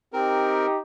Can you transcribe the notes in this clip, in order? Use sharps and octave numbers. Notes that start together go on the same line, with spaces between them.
C4 D#4 G4 A#4